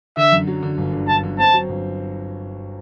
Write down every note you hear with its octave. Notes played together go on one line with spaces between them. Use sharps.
D3 E5
F#2
F#3
D3
G1
D3
G1 A5
D3
C4 A5
F#3
G1